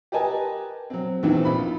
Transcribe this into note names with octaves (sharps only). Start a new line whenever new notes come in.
G4 A#4 B4 D#5 G#5 A5
F#3 C4
E2 A#2 D#3 E3 C4
A#1 F4 B5